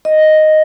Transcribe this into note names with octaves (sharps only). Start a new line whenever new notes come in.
D#5